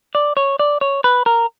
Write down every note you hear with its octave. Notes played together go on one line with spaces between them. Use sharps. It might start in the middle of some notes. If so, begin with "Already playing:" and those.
D5
C#5
D5
C#5
B4
A#4